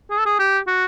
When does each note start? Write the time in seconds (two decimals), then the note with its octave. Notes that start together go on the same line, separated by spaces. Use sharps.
0.11 G#4
0.19 A4
0.26 G#4
0.39 G4
0.67 F#4